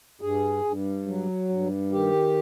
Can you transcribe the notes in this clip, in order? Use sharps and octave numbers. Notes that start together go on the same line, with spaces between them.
G2 G#4
G2
F#3
G2
D#3 G4